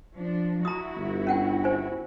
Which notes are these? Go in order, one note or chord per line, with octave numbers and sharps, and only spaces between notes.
F3 D4
E4 F#4 A#5 D#6
G1
C#4 F#5 G5
C5 G#5